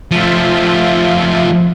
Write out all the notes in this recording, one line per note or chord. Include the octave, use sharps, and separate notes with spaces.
F3 A3 F4 E5